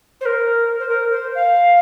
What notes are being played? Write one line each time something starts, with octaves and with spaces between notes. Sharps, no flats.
C5
A#4
C5
A#4
C5
F5